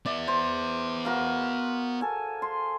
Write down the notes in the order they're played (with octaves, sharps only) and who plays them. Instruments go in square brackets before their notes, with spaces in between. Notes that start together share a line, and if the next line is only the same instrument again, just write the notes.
[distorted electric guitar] B3 E5 [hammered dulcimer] D5
[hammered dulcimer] C5
F#4 A#4 F5
A4 G#5
C6